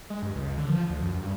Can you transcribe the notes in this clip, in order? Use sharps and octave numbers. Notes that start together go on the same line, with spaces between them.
G#3
G2
C#2
D3
F3
D2
F#2
G2